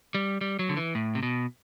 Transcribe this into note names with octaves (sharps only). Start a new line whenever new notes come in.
G3
G3
F#3
D3
E3
A2
C3
B2